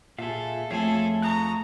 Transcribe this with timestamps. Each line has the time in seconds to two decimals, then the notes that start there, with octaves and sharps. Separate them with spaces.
0.18 A#2 F4 G#4 A4 E5 F5
0.71 F2 F3 A3 G#4 A4 C#5 E5 F5
1.22 A#5 C#6 D#6 F#6